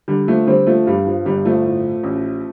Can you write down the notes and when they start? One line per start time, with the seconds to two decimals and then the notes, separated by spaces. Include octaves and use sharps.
0.08 D3 G3
0.28 F3 A3
0.47 D3 G3 C4
0.67 F3 A3
0.87 G2 G3
1.07 F3
1.26 G1 G3
1.45 F3 A3
1.65 A2
2.04 A1